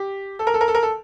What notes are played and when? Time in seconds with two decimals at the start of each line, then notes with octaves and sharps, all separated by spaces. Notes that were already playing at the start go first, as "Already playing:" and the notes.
Already playing: G4
0.39 A4
0.47 A#4
0.54 A4
0.61 A#4
0.68 A4
0.75 A#4
0.83 A4